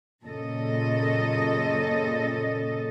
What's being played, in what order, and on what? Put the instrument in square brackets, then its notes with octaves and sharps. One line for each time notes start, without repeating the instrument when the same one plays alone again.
[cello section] F#2 A#2 C#3 A4 D#5